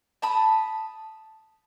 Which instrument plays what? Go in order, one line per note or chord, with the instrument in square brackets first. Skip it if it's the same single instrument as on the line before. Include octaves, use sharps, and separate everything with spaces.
[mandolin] A5 B5 D#6